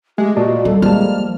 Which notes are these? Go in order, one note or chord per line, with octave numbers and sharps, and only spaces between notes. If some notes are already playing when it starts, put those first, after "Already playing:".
G#3 A3 G4
A#2 F#4 D5 D#5 A5
G3 A4
F3 G3 G#3 A#3 A5 F6